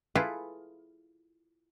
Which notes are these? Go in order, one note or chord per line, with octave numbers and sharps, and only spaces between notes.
E4 F4 G#4 A4 B4 F5